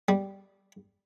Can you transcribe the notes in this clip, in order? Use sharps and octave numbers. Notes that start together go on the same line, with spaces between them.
G3